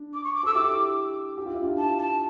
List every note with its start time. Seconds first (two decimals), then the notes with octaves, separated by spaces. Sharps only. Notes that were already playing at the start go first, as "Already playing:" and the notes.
Already playing: D4
0.14 D6
0.24 C#6
0.34 D6
0.43 A4 E6
0.54 E4 G4 D6
1.37 G4
1.46 F4
1.54 E4
1.63 D4 F4
1.78 A5
1.98 A5